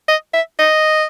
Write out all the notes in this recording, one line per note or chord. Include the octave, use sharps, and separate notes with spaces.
D#5
E5
D#5